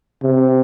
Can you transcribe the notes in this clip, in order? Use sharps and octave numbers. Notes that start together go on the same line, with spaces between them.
C3